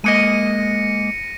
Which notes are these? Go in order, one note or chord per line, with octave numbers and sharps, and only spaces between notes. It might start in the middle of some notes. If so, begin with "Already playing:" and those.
G#3 A#3 D#5 A#6 C#7 D#7